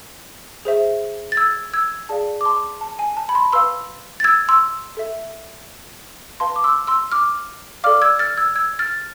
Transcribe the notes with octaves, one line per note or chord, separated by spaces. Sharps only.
G#4 C5 E5
A6
E6 G#6
E6 G#6
G#4 D5 F5 A5
D6
A5 C6
A5
G#5
A5
B5
A5 C6
B4 F5 C6 E6
A6
E6 G#6
C6 E6
A4 E5
B4 F5 A5 C6
D6
C6 E6
C6 E6
D6 F6
A4 D5 F5 D6 F6
E6 G#6
F6 A6
E6 G#6
E6 G#6
F6 A6
A6